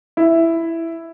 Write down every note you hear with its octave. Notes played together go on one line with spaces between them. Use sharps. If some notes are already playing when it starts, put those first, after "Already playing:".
E4